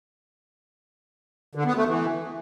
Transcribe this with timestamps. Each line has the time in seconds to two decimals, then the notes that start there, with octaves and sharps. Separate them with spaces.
1.55 D3
1.66 B3
1.76 A3
1.87 E3